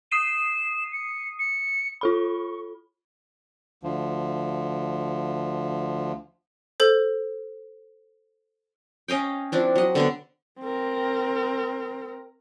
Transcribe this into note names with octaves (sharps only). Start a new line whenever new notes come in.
D#6 C7 D#7 E7
C#7
C#7
F4 A4 B5 C#6
D2 F3
A4 C5
C#4 D#5 F5 G5
F3 C4 D4 E4
F#3 D#5
D3 B3 D4
C4 A#4